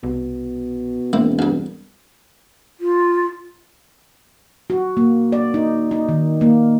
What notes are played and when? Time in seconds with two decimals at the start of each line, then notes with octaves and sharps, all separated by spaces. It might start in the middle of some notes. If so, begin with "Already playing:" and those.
0.03 C2 B2
1.13 E1 A#3 C4 E4
1.39 D2 G2
2.80 F4
4.70 F#4
4.97 A#3
5.32 D5
5.54 D#4
5.91 D#4
6.09 D#3
6.41 A#3